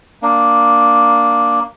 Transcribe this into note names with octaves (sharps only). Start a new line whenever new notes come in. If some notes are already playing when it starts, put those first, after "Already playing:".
A#3 D4